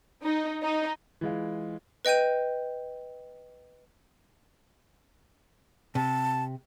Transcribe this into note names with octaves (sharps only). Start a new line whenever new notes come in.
D#4
D#4
E3 G#3 F4
B4 D#5 G5 G6 D#7
C3 A5